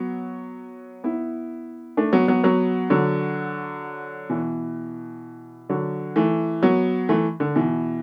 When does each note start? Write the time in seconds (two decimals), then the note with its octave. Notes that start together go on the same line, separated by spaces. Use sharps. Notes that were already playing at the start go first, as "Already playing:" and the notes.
Already playing: F#3 B3
1.04 B3 E4
1.97 A3 D4
2.13 F#3 B3
2.28 F#3 B3
2.43 F#3 B3
2.90 D3 F#3
4.30 B2 E3
5.69 D3 F#3
6.16 E3 A3
6.63 F#3 B3
7.09 E3 A3
7.40 D3
7.56 B2 E3